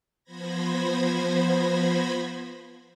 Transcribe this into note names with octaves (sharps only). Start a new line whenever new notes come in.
F3 B3 C5 B5 G#6 A#6